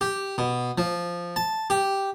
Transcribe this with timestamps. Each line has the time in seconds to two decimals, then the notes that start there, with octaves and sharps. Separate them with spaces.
0.01 G4
0.38 B2
0.78 F3
1.36 A5
1.70 G4